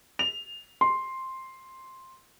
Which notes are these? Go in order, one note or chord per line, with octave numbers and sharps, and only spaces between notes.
F7
C6